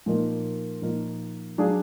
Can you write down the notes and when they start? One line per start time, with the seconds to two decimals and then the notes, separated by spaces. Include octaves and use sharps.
0.06 A#2 F3 A#3 D#4 A#4
0.82 A#2 F3 A#3 D#4 A#4
1.58 F#3 D4 G#4 D5 F5